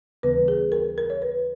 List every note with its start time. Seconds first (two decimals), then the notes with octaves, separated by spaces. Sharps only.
0.23 D#2 C#3 E3 G3 B3 B4
0.48 G#4
0.72 A#4
0.98 A#4
1.10 C#5
1.22 B4